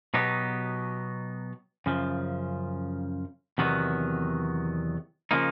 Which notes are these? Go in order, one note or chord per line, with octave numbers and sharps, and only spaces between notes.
B2 F#3 B3 D#4 G4
F#2 C#3 F3
E2 C3 D#3 F#3 B3
C#3 F3 A#3 D#4